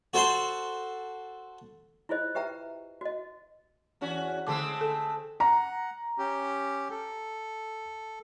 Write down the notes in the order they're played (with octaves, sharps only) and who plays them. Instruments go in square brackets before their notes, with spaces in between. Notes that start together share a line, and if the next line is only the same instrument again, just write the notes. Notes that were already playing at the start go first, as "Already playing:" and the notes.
[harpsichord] F#4 A4 C5 F#5 A5 C6
[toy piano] E4 F4 G#4 C5 D#5
G4 B4 E5 G5 A#5
F#4 D#5
[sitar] E2 C#4 F#4
[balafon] D3 A5 D6 [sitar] G#3 A3 C4
[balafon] A4
[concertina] F#5 [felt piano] A#5
[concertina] C#4 G4
A4